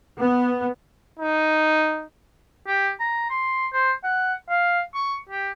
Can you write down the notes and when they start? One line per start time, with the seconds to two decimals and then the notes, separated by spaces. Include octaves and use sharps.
0.19 B3
1.19 D#4
2.67 G4
3.00 A#5
3.30 C6
3.73 C5
4.04 F#5
4.49 F5
4.95 C#6
5.29 G4